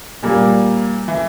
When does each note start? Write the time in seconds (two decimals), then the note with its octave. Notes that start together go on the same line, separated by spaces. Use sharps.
0.23 A#2 G3 A#3
1.08 E3